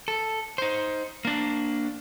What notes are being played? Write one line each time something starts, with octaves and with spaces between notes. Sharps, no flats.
A4
D#4 C5
A#3 D4